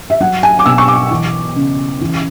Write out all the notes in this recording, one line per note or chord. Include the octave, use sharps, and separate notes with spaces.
E5
F#3 F#5
G#5
D6
B2 E6
C#6
D6
E3
C#3
E3